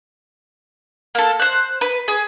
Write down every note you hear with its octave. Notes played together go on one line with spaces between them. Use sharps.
A#3 A4
C5 F#6
B4
G#4